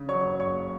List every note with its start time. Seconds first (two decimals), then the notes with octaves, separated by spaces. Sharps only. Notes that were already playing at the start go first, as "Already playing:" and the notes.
Already playing: C#3
0.09 F#3 C#5 C#6
0.24 F#1
0.40 F#1 C#5 C#6